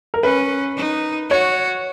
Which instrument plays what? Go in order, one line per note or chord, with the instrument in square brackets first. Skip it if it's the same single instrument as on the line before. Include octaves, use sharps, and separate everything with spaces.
[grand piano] A#4
[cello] C#4 [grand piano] B4
[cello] D#4
[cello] F#4 [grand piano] C#5